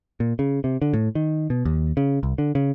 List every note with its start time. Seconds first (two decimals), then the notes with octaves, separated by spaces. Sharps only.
0.20 A#2
0.39 C#3
0.64 C3
0.82 D3
0.93 A2
1.15 D#3
1.50 B2
1.65 D#2
1.97 C#3
2.23 C2
2.38 D3
2.55 C#3